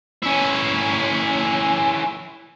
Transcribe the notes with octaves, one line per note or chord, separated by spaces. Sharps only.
C#4 E4